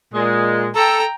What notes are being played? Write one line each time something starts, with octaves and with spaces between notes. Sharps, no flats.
A#2 G#3
A4 G5 A#5